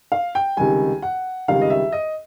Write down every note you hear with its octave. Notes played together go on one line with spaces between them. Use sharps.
F5
G5
C#2 C3 D#3 G3 G#5
F#5
C#2 C3 D#3 G3 F5
D#5
E5
D#5